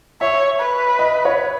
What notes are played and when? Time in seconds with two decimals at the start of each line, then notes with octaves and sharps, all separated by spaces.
0.21 C#5 E5
0.60 B4
0.99 D#5
1.25 C#5